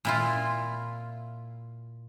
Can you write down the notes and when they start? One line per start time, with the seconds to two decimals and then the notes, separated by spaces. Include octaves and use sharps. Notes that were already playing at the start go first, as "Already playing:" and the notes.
0.05 A#2 E4 F4